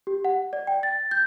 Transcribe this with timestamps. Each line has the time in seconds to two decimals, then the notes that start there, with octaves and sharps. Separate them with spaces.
0.07 G4
0.25 F#5
0.53 D5
0.67 G5
0.83 A6
1.11 G6